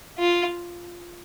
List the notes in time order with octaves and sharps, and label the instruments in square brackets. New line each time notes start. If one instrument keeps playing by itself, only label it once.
[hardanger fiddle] F4